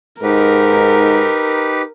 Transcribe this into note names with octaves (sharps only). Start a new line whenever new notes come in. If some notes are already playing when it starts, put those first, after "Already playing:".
G#2 D#4 G4 A#4 B4